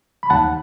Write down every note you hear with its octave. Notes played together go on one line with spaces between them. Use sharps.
B5
D#2 F#5 A5